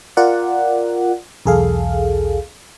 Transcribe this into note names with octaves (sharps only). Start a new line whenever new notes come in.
F4 A#4 D5 F#5
B1 E2 G#4 A4 F5